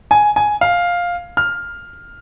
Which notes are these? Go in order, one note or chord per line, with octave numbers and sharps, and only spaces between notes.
G#5
G#5
F5
F6